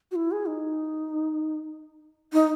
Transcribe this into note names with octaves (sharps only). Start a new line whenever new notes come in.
F#4
E4
G#4
D#4
D#4